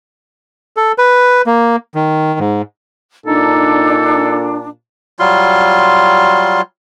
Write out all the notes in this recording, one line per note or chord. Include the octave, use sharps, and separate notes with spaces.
A4
B4
A#3
D#3
G#2
A#2 D4 D#4 A4
F#3 G3 F4 C6